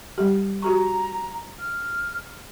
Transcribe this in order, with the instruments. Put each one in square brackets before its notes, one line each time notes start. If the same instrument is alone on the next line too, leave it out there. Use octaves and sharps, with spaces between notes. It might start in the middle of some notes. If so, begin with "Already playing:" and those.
[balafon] G3 G4
[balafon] F#4 G4 C#6 [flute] A#5
[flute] F6